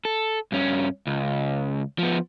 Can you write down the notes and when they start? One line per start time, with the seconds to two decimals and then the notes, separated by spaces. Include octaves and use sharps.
0.05 A4
0.52 G2 C#4
1.07 C#2
1.99 F3 B3